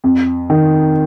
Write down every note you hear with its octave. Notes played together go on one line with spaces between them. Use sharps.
F2
D#3